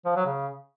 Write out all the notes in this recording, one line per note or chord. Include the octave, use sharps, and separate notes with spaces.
F3
F#3
C#3